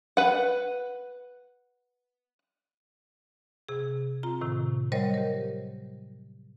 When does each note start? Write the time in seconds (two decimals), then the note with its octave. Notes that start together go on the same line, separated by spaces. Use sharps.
0.17 B4 F#5
3.69 C3 G#4
4.23 C4 F4 A#5
4.41 A2 C3 D#3
4.92 F#3 G3 A#4 C5 C#5 D#5
5.14 G4 A#4